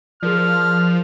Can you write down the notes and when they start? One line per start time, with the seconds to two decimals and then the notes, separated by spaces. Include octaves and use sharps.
0.23 F3 G#4 A#4 D5 F6